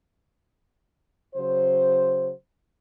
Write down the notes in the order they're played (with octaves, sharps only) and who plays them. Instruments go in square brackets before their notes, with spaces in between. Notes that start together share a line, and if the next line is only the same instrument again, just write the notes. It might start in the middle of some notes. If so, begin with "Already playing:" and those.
[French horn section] C#3 F#3 C5